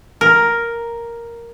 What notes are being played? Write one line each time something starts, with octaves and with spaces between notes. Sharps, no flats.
A#4